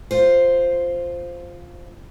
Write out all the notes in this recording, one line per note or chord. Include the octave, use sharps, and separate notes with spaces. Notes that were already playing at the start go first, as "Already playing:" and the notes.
F4 C5